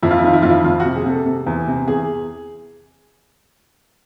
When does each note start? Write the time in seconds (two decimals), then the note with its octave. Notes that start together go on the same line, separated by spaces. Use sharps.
0.03 F2 E4
0.11 F4
0.18 E4
0.23 D#3 F4
0.33 E4
0.42 F2 F4
0.49 E4
0.64 F2 F4
0.80 F#4
0.85 C3
0.96 G#4
1.05 C3 A4
1.25 C3
1.46 E2
1.67 C3
1.87 E2 G#4